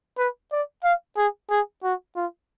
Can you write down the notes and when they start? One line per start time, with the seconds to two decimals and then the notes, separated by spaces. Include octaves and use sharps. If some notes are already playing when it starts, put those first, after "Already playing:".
0.18 B4
0.52 D5
0.84 F5
1.17 G#4
1.50 G#4
1.84 F#4
2.16 F4